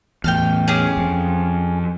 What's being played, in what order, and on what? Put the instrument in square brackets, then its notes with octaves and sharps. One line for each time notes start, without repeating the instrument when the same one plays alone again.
[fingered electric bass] E2 A2 [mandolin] G5 A5 F6
[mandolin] C#4 G4 G#4
[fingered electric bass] F2